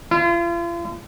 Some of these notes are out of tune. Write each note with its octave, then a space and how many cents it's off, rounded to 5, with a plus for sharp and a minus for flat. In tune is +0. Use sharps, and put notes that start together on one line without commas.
F4 -40